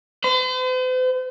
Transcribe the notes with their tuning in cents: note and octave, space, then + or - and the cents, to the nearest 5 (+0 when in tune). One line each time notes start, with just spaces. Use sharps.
C5 -45